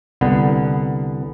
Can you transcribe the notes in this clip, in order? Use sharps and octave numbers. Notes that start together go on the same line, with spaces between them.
C2 D3 B3